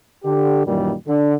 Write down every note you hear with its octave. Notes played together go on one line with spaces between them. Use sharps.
D3 G4
F#2 A#2 D#3 E3 G3
D3